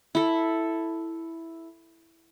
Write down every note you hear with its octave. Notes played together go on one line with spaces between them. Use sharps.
E4 A4